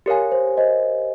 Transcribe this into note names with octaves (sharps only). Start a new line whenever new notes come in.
G4 A#4 C#5 F5 G#5
C5
C5 D#5